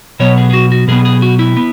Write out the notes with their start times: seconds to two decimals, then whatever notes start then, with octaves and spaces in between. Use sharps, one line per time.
0.20 B2 F#3 B3 C#5
0.37 G#4
0.50 G#4
0.53 F#4
0.72 F#4
0.88 B2 F#3 B3 G#4
1.05 G#4
1.22 F#4
1.39 E4
1.57 B3